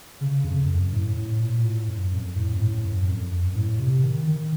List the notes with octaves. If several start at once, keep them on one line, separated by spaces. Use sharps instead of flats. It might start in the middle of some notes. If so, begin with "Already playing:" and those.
C#3
F2
F2
F#2
A2
A2
A#2
A2
F#2
F2
A2
F#2
A2
F#2
F2
F#2
A2
C3
D#3
D#3